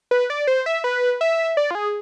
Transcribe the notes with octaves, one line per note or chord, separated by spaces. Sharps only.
B4
D5
C5
E5
B4
E5
D5
F4
G#4